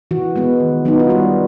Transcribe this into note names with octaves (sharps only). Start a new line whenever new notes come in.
E3 F#4
G#3 B3
D#3
F#3 B3 D#4
F4
G3 F#4